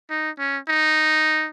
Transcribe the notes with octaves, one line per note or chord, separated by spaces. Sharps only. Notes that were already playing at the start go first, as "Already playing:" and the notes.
D#4
C#4
D#4